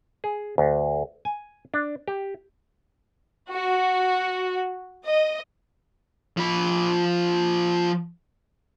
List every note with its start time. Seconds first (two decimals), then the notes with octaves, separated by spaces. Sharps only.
0.24 G#4
0.58 D2
1.25 G#5
1.74 D4
2.08 G4
3.50 F#4
5.06 D#5
6.37 F3 B5